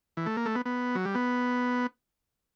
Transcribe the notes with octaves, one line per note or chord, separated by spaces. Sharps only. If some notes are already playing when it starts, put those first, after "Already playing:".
E3
A3
A#3
A3
B3
B3
F#3
G3
B3